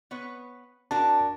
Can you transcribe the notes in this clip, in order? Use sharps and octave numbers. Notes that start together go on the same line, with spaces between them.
B3 B4 C#5
D4 F#4 A#4 A5